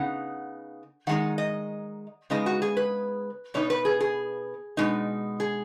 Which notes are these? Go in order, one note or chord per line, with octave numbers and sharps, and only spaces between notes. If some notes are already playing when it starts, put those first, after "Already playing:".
Already playing: C#3 B3 D#4 F#5
D#3 G#3 D#4 F#5
D#5
C#3 G#3 B3 D#4 D#5
F#4
G#4
B4
B2 B3 D#4 C#5
B4
G#4
G#4
B2 G#3 D#4
G#4